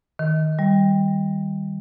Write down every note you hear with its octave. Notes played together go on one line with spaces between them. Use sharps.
D#3
G3